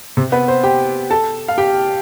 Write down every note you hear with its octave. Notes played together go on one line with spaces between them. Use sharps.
C3 C4
B3 B4
C4 C5
G4 G5
A4 A5
F5
G4 G5